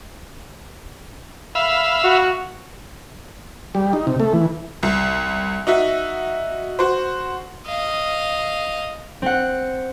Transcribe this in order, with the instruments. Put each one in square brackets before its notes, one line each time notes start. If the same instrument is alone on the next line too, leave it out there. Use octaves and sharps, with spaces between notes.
[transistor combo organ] E5 F5 B5
[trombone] F#4
[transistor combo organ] G3
D#4
C3
A3
E3
[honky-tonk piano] C2
D#4 F#4 E5
F#4 C5
[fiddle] D#5 F5
[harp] C4 F#5